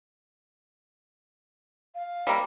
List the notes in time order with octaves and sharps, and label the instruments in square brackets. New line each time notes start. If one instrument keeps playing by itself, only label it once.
[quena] F5
[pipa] G3 A#3